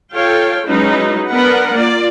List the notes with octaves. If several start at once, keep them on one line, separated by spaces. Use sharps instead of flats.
F4 A4 C#5 F5 G5
F#3 G#3 C#4 D#4 E4 B4
B3 D4 A#4 B4 F#5
A#3 F4 D5